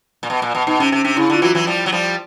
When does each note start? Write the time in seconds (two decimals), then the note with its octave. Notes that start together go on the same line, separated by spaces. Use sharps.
0.23 A#2
0.30 B2
0.42 A#2
0.55 B2
0.67 B2 D#4
0.80 C3 C#4
0.92 C3 C#4
1.04 C3 D4
1.17 C#3 E4
1.30 D3 F4
1.42 E3 F#3 F#4
1.55 E3 F#3
1.67 F3 G3
1.86 F#3
1.92 F3 G3